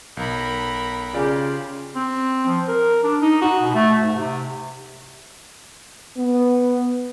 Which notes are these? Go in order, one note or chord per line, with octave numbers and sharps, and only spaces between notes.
B1 A#4 B5
C#3 F4 G4 D5
C4
F3
A#4
D4
D#4
F#4
B2
A3
G#2
C3
B3